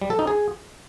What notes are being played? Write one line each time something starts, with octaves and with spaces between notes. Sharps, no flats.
G3
A4
D#4
G#4